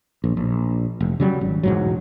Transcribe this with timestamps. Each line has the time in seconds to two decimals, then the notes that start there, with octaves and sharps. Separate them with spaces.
0.24 A#1
0.37 A#1
1.00 F1
1.20 C#3 F#3 G3
1.41 G#1
1.63 E1 G#2 F#3